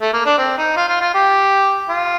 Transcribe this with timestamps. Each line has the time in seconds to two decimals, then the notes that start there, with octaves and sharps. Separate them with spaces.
0.01 A3
0.13 A#3
0.26 D4
0.38 C4
0.58 D#4
0.76 F4
0.88 F4
1.01 F4
1.14 G4
1.89 F4